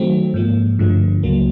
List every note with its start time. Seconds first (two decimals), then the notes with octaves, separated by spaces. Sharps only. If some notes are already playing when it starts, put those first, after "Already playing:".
Already playing: D#3 F#3 A3 C4
0.34 G#2 F3 A#3
0.79 G2 D3 F3 A3
1.23 C#2 C#3 F#3 A#3